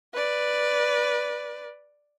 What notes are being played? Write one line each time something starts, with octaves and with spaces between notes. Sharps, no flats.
B4 D5